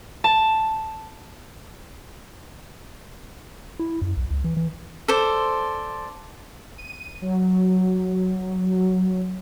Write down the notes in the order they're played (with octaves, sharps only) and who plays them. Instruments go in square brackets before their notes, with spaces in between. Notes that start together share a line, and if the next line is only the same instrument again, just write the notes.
[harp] A5
[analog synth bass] E4
F#2
B1
C#2
E3
E3
[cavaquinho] A4 C5 D5
[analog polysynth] D#7
F#3